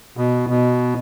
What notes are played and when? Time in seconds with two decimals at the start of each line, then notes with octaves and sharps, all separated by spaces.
0.17 B2
0.49 B2